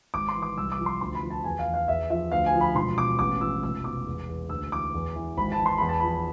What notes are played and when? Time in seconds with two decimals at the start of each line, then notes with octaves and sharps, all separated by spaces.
0.14 G#1 D6
0.28 C6
0.36 E3
0.42 D6
0.57 C2 E6
0.72 D6
0.79 F3
0.86 C6
1.01 D2 C6
1.15 B5
1.23 F3
1.30 A5
1.44 E2 G#5
1.59 F5
1.66 E2
1.74 F5
1.88 E2 E5
2.10 F3 E5
2.32 D2 F5
2.46 G#5
2.54 F3
2.61 B5
2.75 E1 C6
2.97 B2 D6
3.19 A1 D6
3.41 F3 E6
3.63 F1 E6
3.84 B2 D6
4.06 E2
4.28 E2
4.49 D2 E6
4.72 E3 D6
4.94 E2
5.16 E3
5.37 G#1 B5
5.52 A5
5.59 E3
5.66 C6
5.78 E2 B5
5.89 A5
6.00 F3 B5